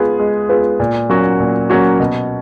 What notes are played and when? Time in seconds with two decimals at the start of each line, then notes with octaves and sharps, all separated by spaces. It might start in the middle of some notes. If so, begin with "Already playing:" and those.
Already playing: G#3 B3 F4 G#4 B4
0.19 G#3
0.49 B3 F4 G#4 B4
0.80 A#2
1.09 F#3 A#3 C#4 F#4
1.40 A#2
1.70 F#3 A#3 C#4 F#4
2.00 B2